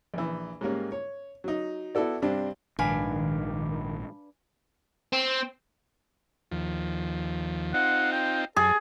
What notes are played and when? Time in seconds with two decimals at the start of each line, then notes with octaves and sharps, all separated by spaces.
0.14 A#1 E3
0.61 G#2 G3 A#3 C#4
0.92 C#5
1.44 F#3 D#4
1.95 B3 E4 F#4 A4 D5
2.22 G2 C3 C4 D4
2.79 A#1 G#2 D#3 D4 B4 F5 G#5
5.13 C4
6.51 D#2 F3
7.74 C4 D#4 F4 F#5
8.12 G5
8.56 F#2 G#4 A4